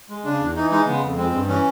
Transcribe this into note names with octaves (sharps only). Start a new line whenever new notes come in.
G#3
C#3 D4
E2
E3 D#4
G#3 D#4
C#3 B3
F2
G#3 C4
G2
E3 C#4